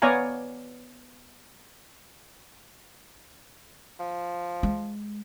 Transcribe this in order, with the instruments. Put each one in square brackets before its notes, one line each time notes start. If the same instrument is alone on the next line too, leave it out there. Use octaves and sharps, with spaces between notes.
[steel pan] B3 C#5 D5 F5 G#5 A#5
[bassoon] F3
[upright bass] G#3